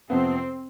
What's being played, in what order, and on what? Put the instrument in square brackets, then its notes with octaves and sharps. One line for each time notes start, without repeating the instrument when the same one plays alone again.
[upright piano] F2 C3 F3 B3 [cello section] C4